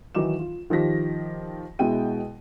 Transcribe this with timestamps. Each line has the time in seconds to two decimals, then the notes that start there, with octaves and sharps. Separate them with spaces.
0.15 D#3 E3 F#3 D#4 D6 E7
0.39 F4
0.70 D#3 F3 G4 A#6 B6
1.79 B2 G#3 E4 G5 D#7